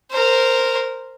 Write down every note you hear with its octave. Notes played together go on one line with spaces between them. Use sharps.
A#4 C5